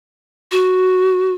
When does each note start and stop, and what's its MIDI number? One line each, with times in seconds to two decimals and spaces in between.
0.52 1.33 66